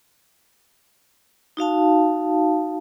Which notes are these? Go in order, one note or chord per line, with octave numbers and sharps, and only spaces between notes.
D#4 F#4 F5 A5